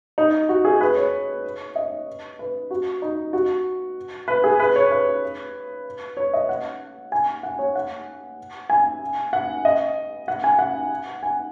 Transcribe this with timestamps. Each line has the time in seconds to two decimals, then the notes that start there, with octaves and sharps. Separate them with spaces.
0.18 D#4
0.49 F#4
0.65 G#4
0.81 B4
0.97 C#5
1.76 D#5
2.39 B4
2.71 F#4
3.02 D#4
3.33 F#4
4.28 B4
4.44 G#4
4.59 B4
4.76 C#5
4.91 B4
6.17 C#5
6.33 D#5
6.49 F#5
7.12 G#5
7.43 F#5
7.59 C#5
7.76 F#5
8.70 G#5
9.33 F#5
9.65 D#5
10.28 F#5
10.44 G#5
10.59 F#5
11.23 G#5